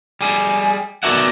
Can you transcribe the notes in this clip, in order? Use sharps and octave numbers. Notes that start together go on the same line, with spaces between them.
G3 G#4
B3 F#4 A#4 D5 E5 F#5